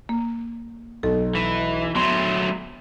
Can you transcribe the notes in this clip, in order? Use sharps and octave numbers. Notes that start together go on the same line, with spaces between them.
A#3
B1 A4
E3
F#3 A3 B3 C6